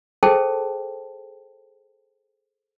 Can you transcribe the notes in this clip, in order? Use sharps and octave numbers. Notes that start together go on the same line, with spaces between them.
G#4 A4 C5 G5 A5